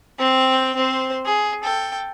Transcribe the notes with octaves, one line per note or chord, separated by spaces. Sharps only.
C4 G5
C4 C5
G#4
A4 G5